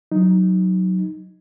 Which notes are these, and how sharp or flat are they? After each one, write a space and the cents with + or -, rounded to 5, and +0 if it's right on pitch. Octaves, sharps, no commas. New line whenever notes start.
F#3 +0 D#4 +0